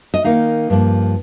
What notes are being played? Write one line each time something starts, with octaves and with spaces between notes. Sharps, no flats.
D#5
D#3 A#3 D#4 F5
G2 F3 A#3